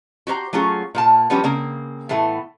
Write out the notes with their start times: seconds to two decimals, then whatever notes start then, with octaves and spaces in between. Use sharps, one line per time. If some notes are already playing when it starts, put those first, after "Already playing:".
0.27 F#4 G4 C5 A#5
0.53 F#3 A3 C#4 F4 G#4
0.95 A#2 A#3 A5
1.30 F3 G3 B3 C#4 D4 F#4
1.44 C#3 A#3 C4
2.09 A2 E3 A3 B3